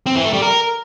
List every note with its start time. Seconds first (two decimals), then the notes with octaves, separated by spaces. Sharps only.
0.06 C4
0.15 E3
0.24 A3
0.33 G3
0.42 A#4